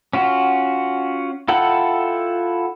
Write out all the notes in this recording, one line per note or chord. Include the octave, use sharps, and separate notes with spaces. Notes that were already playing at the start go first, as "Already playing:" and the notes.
C#4 F4 F#4
E4 F4 A4 F#5 G5